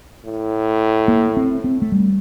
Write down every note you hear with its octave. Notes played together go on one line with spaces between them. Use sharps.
A2
A#3
C4
C4
A3
G3